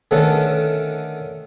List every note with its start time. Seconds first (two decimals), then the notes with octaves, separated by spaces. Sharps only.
0.11 D3 D#3 A3 C#4 A4 B4